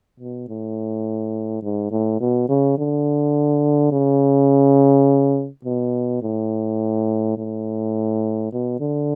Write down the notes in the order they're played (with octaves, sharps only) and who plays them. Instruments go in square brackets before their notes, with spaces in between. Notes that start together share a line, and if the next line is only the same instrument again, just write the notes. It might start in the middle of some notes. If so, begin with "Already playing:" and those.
[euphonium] B2
A2
G#2
A2
B2
C#3
D3
C#3
B2
A2
A2
B2
D3